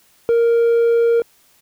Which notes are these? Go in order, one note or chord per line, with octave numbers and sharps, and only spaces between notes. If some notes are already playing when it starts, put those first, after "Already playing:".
A#4